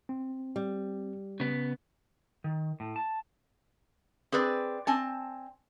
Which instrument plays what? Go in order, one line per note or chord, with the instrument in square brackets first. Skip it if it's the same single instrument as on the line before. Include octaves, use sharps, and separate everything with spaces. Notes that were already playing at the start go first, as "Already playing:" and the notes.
[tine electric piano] C4
[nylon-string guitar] G3
[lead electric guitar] C#3 B3
[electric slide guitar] D#3
A2
A5
[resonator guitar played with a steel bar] C4 G#4 B4 D5
C4 G#5 A5